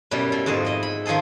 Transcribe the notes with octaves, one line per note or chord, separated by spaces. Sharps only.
F#2 B2 G3 E4
B2
F2 G#2 F#4 G#4
E4 D#5
B5
D#3 F3 D#4 G#4 A4